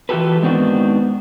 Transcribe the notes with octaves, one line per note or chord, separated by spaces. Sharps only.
E3 F3 F#4 G4 A4 B4
G#2 D#3 B3 C4 D4 F#4